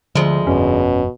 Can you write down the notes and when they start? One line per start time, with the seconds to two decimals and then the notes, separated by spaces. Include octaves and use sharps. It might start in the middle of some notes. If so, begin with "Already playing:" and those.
0.15 D2 D3 F3 G#3
0.47 G1 F2 B2 C#4